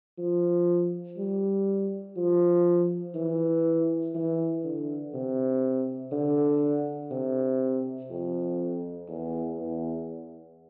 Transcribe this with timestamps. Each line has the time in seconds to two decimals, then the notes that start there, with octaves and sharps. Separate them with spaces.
0.18 F3
1.18 G3
2.16 F3
3.15 E3
4.15 E3
4.64 D3
5.14 C3
6.12 D3
7.11 C3
8.10 F2
9.09 E2
9.59 E2